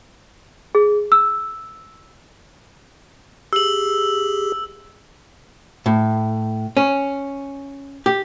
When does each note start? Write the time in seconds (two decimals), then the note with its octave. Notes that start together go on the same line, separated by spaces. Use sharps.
0.75 G#4
1.12 E6
3.53 G4 G#4 E6 F#7
5.86 A2
6.77 C#4
8.06 G4